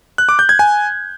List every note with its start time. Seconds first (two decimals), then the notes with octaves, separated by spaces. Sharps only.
0.18 F#6
0.29 D6
0.39 G6
0.49 G#6
0.59 G#5